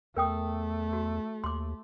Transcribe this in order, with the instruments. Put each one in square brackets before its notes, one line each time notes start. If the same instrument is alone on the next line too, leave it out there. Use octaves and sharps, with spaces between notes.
[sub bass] E2 [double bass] A3 [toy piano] A#4 G5 D#6
[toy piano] F#4
[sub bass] D#2 [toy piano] C6 D6